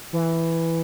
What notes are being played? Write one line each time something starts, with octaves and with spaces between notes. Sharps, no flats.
E3